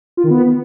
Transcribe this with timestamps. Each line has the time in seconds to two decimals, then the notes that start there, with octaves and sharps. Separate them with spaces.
0.17 F4
0.24 D#3
0.30 B3